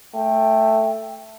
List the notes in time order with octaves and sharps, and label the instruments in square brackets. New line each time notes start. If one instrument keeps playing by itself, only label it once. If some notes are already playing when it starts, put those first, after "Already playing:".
[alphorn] A3 [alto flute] G5